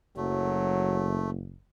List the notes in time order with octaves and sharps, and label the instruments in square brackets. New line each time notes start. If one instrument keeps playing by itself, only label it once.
[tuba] F#1 [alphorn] F#3 [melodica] A3